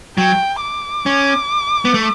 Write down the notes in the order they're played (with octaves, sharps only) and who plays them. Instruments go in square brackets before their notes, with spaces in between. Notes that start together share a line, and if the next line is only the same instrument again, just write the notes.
[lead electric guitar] F#3 [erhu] G5
[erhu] D6
[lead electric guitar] C#4
B3
A3